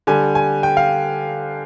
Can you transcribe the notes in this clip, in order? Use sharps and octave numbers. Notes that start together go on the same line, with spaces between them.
D3 G3 G#5
G#5
G5
F5